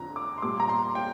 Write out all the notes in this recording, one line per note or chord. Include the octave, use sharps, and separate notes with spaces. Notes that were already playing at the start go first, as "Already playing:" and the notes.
Already playing: F2 D3 F3 A#5
D6
C6
A#2 G3 D6
A#5
C6
G5